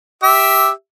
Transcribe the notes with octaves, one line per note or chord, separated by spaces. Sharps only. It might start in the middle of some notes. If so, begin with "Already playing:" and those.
G4 E5